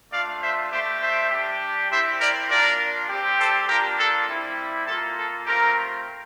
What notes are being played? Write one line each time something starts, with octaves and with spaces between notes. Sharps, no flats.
A3 D4 F4 D5 F5
C5 E5
A3 D4 G4 C5 E5
C5 E5
G3 D4 G4
C4 E4 G4 C5 E5
A#4 D5
A#3 D4 F4 A#4 D5
G3 C4 G4
A4 C5
A#3 D4 F4 G4 A#4
A4
G3 C4 E4
A#3 F4 A4
A4
A3 C4 F4 G4 A#4